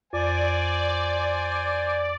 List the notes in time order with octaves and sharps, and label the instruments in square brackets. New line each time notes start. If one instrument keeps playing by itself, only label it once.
[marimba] F2 [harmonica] C5 G#5 [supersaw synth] D5